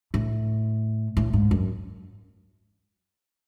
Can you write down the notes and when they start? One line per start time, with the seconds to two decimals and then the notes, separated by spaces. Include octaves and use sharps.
0.14 A2
1.17 A2
1.33 G#2
1.51 F#2